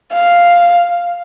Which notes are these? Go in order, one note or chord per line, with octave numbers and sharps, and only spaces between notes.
F5